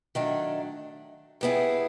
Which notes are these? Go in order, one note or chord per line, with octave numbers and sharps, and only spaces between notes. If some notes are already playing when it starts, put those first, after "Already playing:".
D#3 F#3 A3 D4
G3 B3 E4 G#4